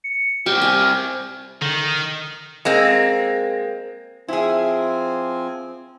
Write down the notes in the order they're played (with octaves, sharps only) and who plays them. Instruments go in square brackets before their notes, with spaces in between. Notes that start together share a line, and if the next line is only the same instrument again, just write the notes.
[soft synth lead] C#7
[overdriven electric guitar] G3 C4 [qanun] G4 [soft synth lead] F6
[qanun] G#5
[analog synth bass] D3 [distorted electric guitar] D#3
[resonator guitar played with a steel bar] G#3 A#3 C4
[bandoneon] F3 C4 G#5 [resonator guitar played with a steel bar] E4 G#4